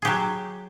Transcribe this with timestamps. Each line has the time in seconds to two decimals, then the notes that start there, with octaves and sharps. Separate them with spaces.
0.02 G#4
0.05 G4
0.07 F#3